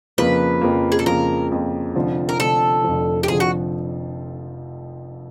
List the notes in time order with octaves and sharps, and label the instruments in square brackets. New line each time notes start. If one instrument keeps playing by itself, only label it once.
[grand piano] F2 C#3 F3 A#3 [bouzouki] B4
[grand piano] F2 C#3 F3 A#3
[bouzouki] G#4
A4
[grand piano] F2 C#3 F3 A#3 [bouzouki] A#4
[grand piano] F2 C#3 F3 A#3
F1 F2 D3 F3
[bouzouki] A#4
[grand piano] F1 F2 D3 F3 [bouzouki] A4
[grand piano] F1 F2 D3 F3
[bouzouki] G4
[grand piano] F1 F2 D3 F3 [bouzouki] G#4
[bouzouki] F#4